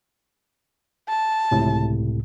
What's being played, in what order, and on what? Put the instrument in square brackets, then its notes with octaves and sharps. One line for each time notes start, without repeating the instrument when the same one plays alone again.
[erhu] A5
[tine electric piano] C#2 A2 C3